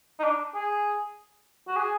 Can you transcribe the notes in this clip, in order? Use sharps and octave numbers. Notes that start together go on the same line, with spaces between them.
D#4
D4
G#4
F#4
G#4